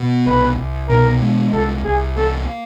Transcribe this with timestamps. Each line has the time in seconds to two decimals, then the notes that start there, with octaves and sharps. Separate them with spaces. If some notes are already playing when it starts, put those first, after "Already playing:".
Already playing: B2
0.26 C2 B4
0.58 C2
0.89 B2 A#4
1.22 G#3
1.53 C2 A4
1.85 C2 G#4
2.16 A#3 A4